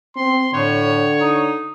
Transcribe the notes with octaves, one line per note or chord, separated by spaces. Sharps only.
C4 C6
A2 D3 C#5
D#4